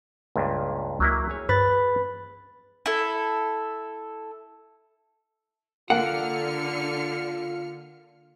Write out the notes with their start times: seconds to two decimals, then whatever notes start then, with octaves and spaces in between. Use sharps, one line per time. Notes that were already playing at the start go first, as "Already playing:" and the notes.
0.36 C#2 G2 A#2
1.00 C#2 F#3 A#3 E4
1.30 G#4 C#5
1.49 G2 B4 A6
2.86 E4 A4
5.90 D3 A#3 F4 F#5 F6 C#7